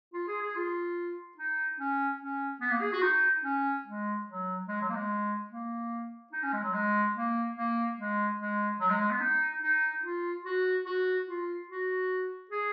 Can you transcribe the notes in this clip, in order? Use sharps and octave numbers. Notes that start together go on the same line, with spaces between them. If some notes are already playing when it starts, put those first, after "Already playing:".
F4
G#4
G#4
F4
D#4
C#4
C#4
B3
A#3
G#4
F#4
D#4
C#4
G#3
F#3
G#3
F#3
A#3
G#3
A#3
D#4
C#4
G#3
F#3
G#3
A#3
A#3
G#3
G#3
F#3
G#3
G#3
B3
D#4
D#4
F4
F#4
F#4
F4
F#4
G#4